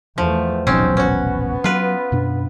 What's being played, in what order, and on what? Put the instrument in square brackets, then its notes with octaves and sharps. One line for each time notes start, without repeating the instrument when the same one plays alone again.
[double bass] E2 A3 [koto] F3
[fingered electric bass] D#1 A1 B2 [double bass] F#3 D#4 [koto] C4 C#4
[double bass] B3 [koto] C#4 F#4
[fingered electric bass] F#3 [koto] F4 B4
[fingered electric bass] F#2 B2 D4